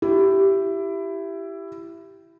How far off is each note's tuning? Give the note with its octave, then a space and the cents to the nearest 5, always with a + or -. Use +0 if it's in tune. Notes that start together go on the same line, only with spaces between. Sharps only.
E4 +15 G4 -10